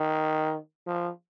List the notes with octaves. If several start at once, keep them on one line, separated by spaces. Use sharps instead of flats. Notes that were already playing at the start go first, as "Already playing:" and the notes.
Already playing: D#3
F3